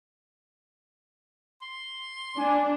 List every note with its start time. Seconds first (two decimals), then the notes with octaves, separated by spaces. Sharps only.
1.62 C6
2.38 D4 G#5